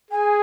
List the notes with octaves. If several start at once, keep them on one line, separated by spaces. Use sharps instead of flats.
G#4 G#5